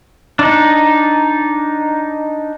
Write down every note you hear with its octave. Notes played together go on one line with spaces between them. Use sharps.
D4 D#4